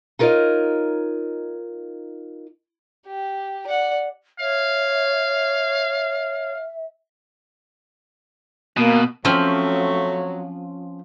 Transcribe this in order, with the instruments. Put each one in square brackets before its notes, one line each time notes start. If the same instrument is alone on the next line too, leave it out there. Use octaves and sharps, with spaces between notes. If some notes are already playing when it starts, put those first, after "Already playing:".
[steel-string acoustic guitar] D#4 F4 A#4 B4 C#5 D#5
[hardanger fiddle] G4
D5 F#5
[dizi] C#5 [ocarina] E5 [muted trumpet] F5
[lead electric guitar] B2 [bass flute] A#3
[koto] F3 [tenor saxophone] F#3 [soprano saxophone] A3 [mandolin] C4 C#4